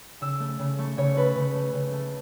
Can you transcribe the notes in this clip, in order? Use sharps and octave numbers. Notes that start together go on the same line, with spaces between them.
C#3 E6
A3
C#3
A3 C#6
C#3 C#5
A3 B4
C#3
A3
C#3
A3